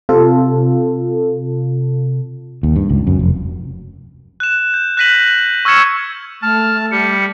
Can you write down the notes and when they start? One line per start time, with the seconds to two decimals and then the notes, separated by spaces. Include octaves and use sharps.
0.09 C3 F4 A4
2.63 D#2
2.76 G2
2.89 C#2
3.07 F#2
3.19 F1
4.40 F#6 E7
4.74 G6
4.97 F#6 G6 A#6 B6 D#7 F#7
5.35 F#7
5.65 C#6 E6 F6 G#6 C#7 E7
6.42 A3 A5 F6
6.91 G3 C#7